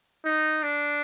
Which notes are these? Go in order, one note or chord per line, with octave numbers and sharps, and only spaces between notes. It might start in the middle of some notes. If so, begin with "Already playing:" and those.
D#4
D4